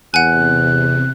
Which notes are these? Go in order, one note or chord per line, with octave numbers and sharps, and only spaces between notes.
E2 C3 F#5 G#5 F#6